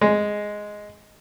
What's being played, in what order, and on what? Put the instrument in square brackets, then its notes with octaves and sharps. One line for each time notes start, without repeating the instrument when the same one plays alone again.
[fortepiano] G#3